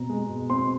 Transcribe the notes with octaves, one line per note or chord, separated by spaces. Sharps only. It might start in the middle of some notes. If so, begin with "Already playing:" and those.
Already playing: B2 C4 A#5
G#3
B2
C4 C6